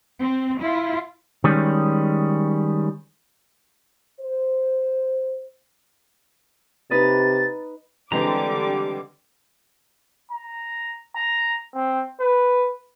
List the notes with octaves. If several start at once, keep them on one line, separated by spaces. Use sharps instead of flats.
C4
E4 F4
D#3 G3 G#3 C#4
C5
C3 D#4 B4 D#5 A6
D3 E3 G3 G#3 C4 G4 A#5 D6
A#5
A#5
C4
B4